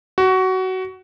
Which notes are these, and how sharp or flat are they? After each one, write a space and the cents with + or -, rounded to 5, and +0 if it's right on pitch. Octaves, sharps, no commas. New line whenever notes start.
F#4 +20